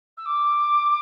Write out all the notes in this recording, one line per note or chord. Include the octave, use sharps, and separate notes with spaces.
E6
D6